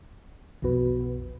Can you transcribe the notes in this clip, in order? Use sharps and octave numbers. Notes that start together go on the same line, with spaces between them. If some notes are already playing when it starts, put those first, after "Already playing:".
B1 F2 B2 F#4 B4